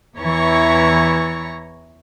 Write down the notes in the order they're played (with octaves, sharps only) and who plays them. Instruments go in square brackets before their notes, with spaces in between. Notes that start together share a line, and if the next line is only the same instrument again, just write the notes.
[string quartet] E2 E3 E4 C#5 A#5 C#6